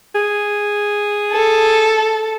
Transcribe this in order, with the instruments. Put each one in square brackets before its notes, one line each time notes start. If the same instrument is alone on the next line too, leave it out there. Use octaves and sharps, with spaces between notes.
[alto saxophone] G#4
[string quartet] A4